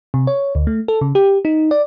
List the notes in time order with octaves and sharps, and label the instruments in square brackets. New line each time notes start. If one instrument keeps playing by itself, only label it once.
[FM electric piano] C3
C#5
D2
A3
A4
C#3
G4
D#4
D5